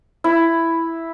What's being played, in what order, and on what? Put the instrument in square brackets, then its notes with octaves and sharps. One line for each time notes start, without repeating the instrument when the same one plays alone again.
[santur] E4